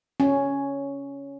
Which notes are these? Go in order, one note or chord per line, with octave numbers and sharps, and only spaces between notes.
C#4